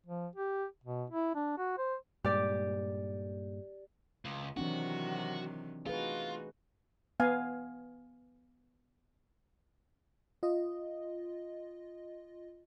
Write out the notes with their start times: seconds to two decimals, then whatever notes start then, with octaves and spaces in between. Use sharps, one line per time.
0.07 F3
0.36 G4
0.84 B2
1.10 E4
1.35 D4
1.58 F#4
1.78 C5
2.24 G2 A#2 G#3 G4 D5
4.25 C#2
4.57 C3 D#3 E3 F#3 C4 D4 F#4
5.86 A3 D#4 F4 F#4 G#4 B4
7.20 B3 F5 G#5
10.43 F4 D#5